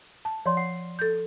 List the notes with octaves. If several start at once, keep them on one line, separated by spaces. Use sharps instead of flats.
A5
F3 C#5 D5 C6
F#5
A4 G6